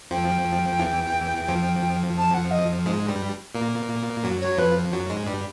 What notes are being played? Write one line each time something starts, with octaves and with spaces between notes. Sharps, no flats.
F2 F3 G5
E2 E3
F2 F3
A5
F#5
D#5
G#2 G#3
G2 G3
A#2 A#3
F#2 F#3
C#5
F2 F3 B4
F#2 F#3
G#2 G#3
G2 G3